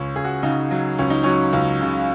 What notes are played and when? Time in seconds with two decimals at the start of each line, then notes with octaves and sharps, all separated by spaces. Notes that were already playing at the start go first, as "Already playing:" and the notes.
Already playing: C#2 C#4
0.15 C#2 G#4
0.24 F#4
0.43 C#3 D#4
0.71 F#3
0.99 C#2 C#4
1.10 D#4
1.23 F#3 C#4
1.53 C#2
1.81 C#3